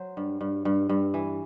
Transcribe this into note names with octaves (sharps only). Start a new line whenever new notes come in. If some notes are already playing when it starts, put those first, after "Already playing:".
Already playing: F#3 C5
G2
G2
G2
G2
E3